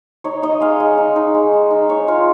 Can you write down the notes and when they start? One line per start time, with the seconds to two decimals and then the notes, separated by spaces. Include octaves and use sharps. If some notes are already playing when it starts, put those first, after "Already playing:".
0.24 D#4 C#5
0.42 D#4 D#5
0.60 G#3 F5
0.80 G#3
0.98 D#4
1.16 D#4
1.34 G#3
1.53 G#3
1.71 D#4
1.89 D#4 C#5
2.07 G#3 F4